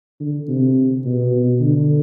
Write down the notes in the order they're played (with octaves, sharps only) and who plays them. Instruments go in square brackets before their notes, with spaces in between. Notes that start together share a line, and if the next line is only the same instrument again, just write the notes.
[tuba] D3
C3
B2
D3